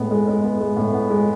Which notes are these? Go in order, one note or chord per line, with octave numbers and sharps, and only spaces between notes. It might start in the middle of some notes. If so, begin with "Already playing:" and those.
Already playing: A2 G#3 B3
G#3
G#3
B3
G#3
A2
B3
G#3